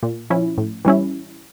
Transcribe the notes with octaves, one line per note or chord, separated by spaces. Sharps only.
A#2
F3 C#4 E4
A2
E3 G3 C#4 E4